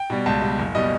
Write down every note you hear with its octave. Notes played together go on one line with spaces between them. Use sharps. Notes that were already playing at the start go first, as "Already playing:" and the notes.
Already playing: G5
B2 G3
C#2 A5
B2 G3
F#1
B2 G3 D#5